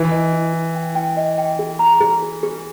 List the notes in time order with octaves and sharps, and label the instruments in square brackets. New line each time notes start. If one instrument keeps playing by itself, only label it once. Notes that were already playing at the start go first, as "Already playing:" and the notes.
Already playing: [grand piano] E3
[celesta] D#5
E4
E4
G5
G5
D#5
G5
G#4
A#5
G#4
G#4
G#4